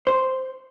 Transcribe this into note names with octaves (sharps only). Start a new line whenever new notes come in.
C5